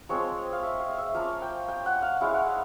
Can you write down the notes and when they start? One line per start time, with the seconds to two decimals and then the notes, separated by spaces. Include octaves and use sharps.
0.09 F3 G#3 C4 C#5
0.53 F5
0.63 E5
0.80 F5
0.98 E5
1.15 F3 A#3 C#4 F5
1.42 G5
1.68 G5
1.86 F#5
2.02 F5
2.21 G#3 C#4 E4 F5
2.33 F#5
2.47 F5